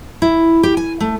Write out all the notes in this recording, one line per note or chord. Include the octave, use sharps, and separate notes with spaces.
E4
G4
G#5
A3